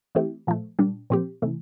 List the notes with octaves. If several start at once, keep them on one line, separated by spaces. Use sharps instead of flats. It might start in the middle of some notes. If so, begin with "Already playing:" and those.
E3 A3 C4 E4 G4
A#2 F3 A3
A#2 G3 D4
A#2 F3 C4 G4
C3 E3 A3